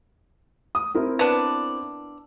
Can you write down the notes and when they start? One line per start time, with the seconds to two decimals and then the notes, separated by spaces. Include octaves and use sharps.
0.75 D#6
0.95 C4 E4 A#4
1.19 B3 D4